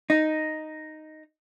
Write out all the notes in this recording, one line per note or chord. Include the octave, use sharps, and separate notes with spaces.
D#4